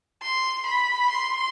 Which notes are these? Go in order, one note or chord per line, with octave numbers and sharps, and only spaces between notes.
C6
B5
C6